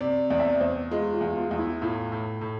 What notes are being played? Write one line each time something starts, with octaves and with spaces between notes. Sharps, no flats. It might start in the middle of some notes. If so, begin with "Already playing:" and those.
C3 D5
E2 D5
E5
D5
E2 C5
G#3 F4
F4
E2
F4
E2
E4
A2 F4
A2
A2